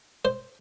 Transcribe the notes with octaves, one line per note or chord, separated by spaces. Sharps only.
C5